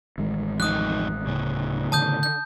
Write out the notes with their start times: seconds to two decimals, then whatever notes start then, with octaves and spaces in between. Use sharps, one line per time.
0.18 A1 D#3 G#3
0.60 F2 D#4 D#6 F#6
1.27 D1 A2 C#3
1.92 D3 D#3 A5 D#6 G6
2.23 G6